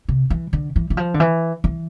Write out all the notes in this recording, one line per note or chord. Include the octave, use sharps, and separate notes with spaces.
C3
E3
D3
E3
E3
F3
D3
E3
E3